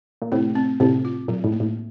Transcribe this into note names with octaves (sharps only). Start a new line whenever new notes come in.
A#2
A2 C3 A3
C4
A2 C3 C4
F4
A#2 F#3
A2
A#3
A2